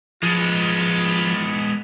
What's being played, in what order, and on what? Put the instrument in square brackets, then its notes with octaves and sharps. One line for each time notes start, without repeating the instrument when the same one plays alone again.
[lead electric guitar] F3 [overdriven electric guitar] G#3 B3 [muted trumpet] F4